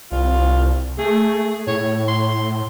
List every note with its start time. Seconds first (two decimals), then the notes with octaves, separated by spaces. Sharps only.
0.12 C2 F4
0.98 A3 G#4
1.67 A2 C#5
2.08 C6